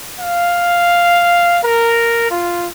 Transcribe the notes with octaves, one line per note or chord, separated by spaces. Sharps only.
F5
A#4
F4